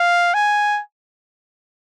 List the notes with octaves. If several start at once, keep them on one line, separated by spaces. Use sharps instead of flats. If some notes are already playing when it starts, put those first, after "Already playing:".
Already playing: F5
G#5